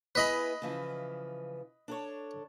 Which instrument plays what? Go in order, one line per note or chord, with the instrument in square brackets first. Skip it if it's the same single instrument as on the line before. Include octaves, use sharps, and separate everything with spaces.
[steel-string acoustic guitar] B3 E4 G#4 [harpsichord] B4 D#5 B5
[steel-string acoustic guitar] C#3 E3 F3
D4 A4 C#5